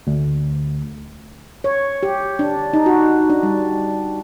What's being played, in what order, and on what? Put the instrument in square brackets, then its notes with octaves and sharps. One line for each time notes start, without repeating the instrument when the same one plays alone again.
[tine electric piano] D2
[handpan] C#5
G4
D4
D#4
F#4
D4
G3